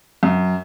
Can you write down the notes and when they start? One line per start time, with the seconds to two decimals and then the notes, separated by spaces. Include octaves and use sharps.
0.23 F#2